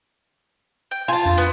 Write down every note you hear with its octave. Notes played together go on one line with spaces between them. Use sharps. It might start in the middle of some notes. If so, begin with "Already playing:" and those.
G5
F4 G#5 A5
F2 D4
B3